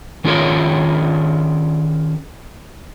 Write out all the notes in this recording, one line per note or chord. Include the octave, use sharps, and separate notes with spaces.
D#3 C#4 F4 G#4 A#4 C#5